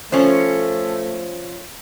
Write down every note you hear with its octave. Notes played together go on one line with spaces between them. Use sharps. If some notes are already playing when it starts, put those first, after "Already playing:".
F3 A3 C#4 C5